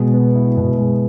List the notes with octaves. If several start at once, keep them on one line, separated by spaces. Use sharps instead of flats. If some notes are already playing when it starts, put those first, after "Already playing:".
Already playing: B2 G#3
B3
E4
B2
G#3